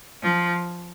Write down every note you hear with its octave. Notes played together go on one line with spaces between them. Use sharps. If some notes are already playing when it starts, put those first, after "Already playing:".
F3